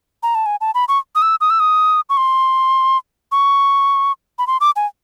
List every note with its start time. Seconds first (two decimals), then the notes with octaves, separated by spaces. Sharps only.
0.23 A#5
0.35 A5
0.46 G#5
0.61 A5
0.75 B5
0.88 C#6
1.15 D#6
1.22 E6
1.41 D#6
1.50 E6
1.60 D#6
2.10 C#6
2.17 C6
3.32 C#6
4.39 B5
4.47 C6
4.61 D6
4.76 G#5